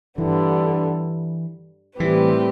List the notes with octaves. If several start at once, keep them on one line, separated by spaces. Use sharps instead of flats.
G2 D3 E3 G3 B3
A2 E3 G3 C4 G4 B4